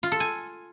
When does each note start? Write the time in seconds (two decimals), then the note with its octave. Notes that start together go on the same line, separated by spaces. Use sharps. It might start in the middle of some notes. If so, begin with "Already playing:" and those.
0.03 F4
0.12 A4
0.20 G#5